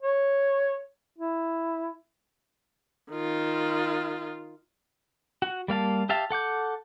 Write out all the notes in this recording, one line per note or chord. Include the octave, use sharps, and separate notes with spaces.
C#5
E4
D#3 F4
F#4
G3 A#3 F5 A5
G4 E5 F5 A5
A4 F#5 D6 G6